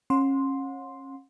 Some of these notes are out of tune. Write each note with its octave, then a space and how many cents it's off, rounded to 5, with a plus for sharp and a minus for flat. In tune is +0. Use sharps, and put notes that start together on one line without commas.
C#4 -30 F#5 -40 C6 +0